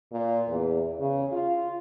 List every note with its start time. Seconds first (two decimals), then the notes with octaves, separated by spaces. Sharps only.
0.12 A#2
0.48 E2
1.00 C#3
1.32 F4